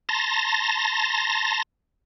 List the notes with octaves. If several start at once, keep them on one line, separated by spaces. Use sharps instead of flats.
A5 A#5 C6 A6 A#6